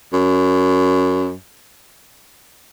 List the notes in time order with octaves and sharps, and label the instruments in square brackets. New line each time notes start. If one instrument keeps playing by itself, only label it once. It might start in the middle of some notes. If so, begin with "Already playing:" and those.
[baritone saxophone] F#2